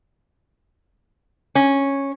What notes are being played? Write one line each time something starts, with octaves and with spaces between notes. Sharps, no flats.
C#4